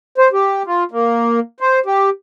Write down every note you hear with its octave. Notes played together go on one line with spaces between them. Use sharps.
C5
G4
F4
A#3
C5
G4